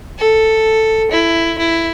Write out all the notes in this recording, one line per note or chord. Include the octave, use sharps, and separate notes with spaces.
A4
E4
E4